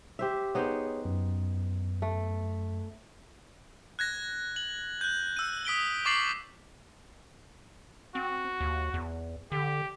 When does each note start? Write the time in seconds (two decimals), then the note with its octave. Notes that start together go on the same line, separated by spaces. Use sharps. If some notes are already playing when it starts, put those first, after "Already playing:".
0.19 G4 C5 E5
0.55 B3 D#4 G#4 C5 C#5
1.05 F#2
2.02 A3
3.99 F#6 G#6 A#6
4.56 F#7
5.01 F#6 G6
5.37 E6 D#7
5.65 D#6 B6 D7 G7
6.05 C#6 D6 A6 C7 F#7
8.15 C4 F#4
8.60 D#2
8.94 E2
9.52 D3 G4